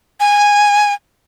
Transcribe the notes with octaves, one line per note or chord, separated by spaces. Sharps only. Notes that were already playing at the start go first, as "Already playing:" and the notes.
G#5